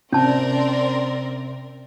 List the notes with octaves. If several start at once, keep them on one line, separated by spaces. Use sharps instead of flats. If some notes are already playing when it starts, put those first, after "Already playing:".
C3 C4 C#4 A#4 D5 A5